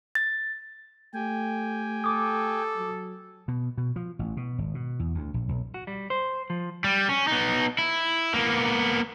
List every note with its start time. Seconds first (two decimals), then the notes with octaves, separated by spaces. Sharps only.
0.15 A6
1.14 A3 G4 G5 G#5
2.04 A4 D6 D#6
2.76 F#3
3.48 B2
3.78 B2
3.96 F3
4.19 A1
4.37 B2
4.58 G#1
4.75 B2
5.00 E2
5.15 D2
5.34 A#1
5.49 B1
5.74 F#4
5.87 G3
6.10 C5
6.50 F3
6.84 G3
7.09 C#4
7.28 B3 D#4
7.78 E4
8.34 A#3 B3